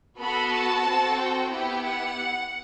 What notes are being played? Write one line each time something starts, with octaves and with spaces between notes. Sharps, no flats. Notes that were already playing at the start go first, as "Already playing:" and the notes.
B3 F#4 A4 B5
A5
C4 F#4 A4
G5
B3 E4 G4 G5
F#5